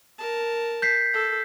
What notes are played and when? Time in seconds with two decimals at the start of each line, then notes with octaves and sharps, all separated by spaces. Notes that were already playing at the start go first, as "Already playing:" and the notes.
0.18 A#4 A5
0.82 G6 B6 C7
1.13 A4